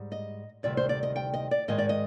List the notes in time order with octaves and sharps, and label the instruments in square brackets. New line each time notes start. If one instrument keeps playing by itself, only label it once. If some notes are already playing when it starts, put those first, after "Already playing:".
Already playing: [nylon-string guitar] G#2 G3
D#5
D2 C3 D#3 G3 D5
C5
D5
D#5
G5
D#5
D5
G#2 D#3 G#3 D#5
D5
D#5